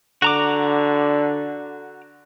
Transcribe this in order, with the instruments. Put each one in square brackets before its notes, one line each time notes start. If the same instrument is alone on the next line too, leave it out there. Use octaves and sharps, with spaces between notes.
[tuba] D3 [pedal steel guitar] F#4 A#5 D6